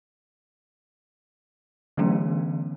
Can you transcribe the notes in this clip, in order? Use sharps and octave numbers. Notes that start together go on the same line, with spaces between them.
D3 E3 F#3 A3 B3 C#4